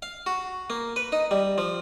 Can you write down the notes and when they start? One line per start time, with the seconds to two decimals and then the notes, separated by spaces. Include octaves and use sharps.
0.02 F5
0.26 F#4
0.70 A#3
0.96 B4
1.12 D#4
1.31 G3
1.58 F3